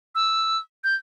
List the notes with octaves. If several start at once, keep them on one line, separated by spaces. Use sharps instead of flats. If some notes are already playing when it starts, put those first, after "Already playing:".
E6
G6